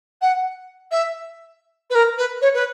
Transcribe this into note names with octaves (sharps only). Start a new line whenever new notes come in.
F#5
E5
B4
A#4
B4
C#5
B4